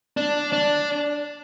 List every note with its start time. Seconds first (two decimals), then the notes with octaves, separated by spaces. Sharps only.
0.17 D4
0.52 D4